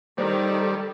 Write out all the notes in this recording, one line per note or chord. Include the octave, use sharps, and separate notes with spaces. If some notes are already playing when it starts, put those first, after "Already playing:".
D#3 G3 A4 C5 D5